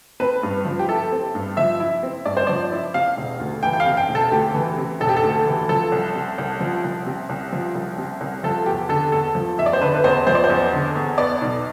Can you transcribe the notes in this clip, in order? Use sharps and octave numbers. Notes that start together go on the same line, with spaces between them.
C4 B4
G2
F3
G4
E4 A4
C4
G2
F3 E5
E4
C4
G2 D5
C5
F3 D5
E4
C3 F5
E1
D2
E3 G5
G5
F5
C3
G5
E1
A4
D2 G4
E3
C3
E1 A4
G4
A4
D2
E3
F3 A4
C2
C3
C2
F3
C2
C3
C2
F3
C2
C3
C2
F3 A4
E2 G4
D3 A4
E2 A4
F3
E2 E5
D5
C5
D3 B4
B4
E2 C5
F3 C5
D5
C5
E2
D3
E2
B3 D5
B1